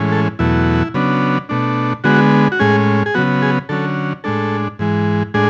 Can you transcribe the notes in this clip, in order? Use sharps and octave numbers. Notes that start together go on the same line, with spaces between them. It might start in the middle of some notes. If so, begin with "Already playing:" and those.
Already playing: A2 E3 G#3 C#4
A4
E2 B2 F#3 A3 E4
C#3 F#3 B3 D4
B2 A3 D4
D3 G#3 B3 F#4
F#4
A2 G#3 C#4 G#4
G#4
C#3 F#3 B3 F#4
G#4
D3 F#3 C#4 A4
A2 G#3 D4 A4
G#2 E3 G#3
A2 G#3 D4 G#4